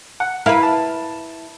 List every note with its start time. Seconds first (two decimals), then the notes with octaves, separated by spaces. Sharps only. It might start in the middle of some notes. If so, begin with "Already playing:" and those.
0.20 F#5
0.46 E4 A#4 B4 F5
0.63 A5